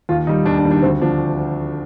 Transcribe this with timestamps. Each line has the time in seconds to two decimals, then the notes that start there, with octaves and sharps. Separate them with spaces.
0.09 D#2 F4
0.27 D#3 G3 D#4
0.45 D#2 D4
0.59 D4
0.65 D#3 G3
0.71 D4
0.82 D2 C4
1.02 D3 F3 D4